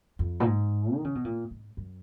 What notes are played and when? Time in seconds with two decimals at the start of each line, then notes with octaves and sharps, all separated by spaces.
0.19 F2
0.40 A#2
0.45 G#2
0.95 D#3
1.05 C#3
1.15 B2
1.25 A#2
1.51 G#2
1.77 F#2